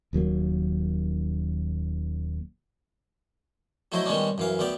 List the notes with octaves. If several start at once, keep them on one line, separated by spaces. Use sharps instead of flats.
D#1 D#2 F#3 A#3
F#3 A3 E4 C5 D#5
D#3 G3 G#3 B3 C#4 D4
F#2 E3 F5
D2 B3 D5 G5